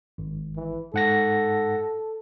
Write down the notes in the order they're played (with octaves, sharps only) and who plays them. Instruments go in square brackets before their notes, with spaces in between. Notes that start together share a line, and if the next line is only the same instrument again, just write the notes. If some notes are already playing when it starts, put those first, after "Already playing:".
[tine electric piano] G#1
[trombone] E3
[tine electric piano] G#2 F#5 A#6 [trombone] A4